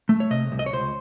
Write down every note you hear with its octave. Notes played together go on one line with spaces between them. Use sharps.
A3
C#5
C3 D#5
C2
D#5
C#5
C#2 C5